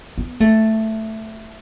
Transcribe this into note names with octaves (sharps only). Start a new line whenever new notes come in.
B3
A3